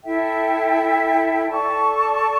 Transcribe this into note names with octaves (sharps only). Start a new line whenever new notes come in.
E4 A4 E5 G5
A4 D5 A5 C#6